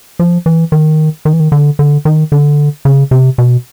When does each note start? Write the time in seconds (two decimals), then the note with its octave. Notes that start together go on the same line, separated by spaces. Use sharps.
0.19 F3
0.46 E3
0.72 D#3
1.25 D#3
1.33 E3
1.40 D#3
1.52 D3
1.79 D3
2.05 D#3
2.32 D3
2.85 C#3
3.11 C3
3.38 B2